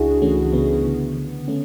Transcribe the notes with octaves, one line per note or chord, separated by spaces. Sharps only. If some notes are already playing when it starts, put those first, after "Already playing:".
Already playing: C#2 C#3 D4 E4 F#4 G#4
E3 A3 C#4
C#3 B3
D3
D3
A3 C#4